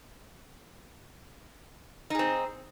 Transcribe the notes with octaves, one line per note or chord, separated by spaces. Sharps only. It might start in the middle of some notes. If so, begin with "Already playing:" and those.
C4 D#4 G#4